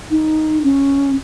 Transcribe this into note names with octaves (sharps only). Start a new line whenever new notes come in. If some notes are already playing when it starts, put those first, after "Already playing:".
D#4
C#4